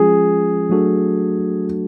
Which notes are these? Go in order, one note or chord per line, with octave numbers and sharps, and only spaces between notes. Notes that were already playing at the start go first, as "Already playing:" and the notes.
Already playing: F3 G#3 C#4 F4 G#4
F#3 A3 D4 F#4 A4